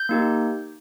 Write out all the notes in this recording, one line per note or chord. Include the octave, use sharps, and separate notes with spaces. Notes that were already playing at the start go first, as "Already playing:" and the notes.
Already playing: G6
A#3 D#4 G4